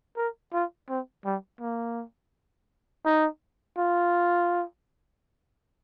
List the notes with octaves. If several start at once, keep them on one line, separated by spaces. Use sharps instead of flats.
A#4
F4
C4
G3
A#3
D#4
F4